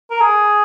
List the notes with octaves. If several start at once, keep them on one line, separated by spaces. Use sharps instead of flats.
A#4
G#4